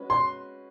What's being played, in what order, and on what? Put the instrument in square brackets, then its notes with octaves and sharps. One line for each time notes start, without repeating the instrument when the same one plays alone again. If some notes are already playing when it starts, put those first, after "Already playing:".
Already playing: [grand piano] G#3 C#4 F#4 B4
[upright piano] C6